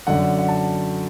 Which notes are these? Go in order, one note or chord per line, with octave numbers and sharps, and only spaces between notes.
F#2 D3 F#5
F#5
A5